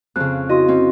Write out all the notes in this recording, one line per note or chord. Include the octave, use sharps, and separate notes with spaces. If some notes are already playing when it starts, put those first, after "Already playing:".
F2 C#3 F#6
E4 F#4 D#5 C6
C4 C#4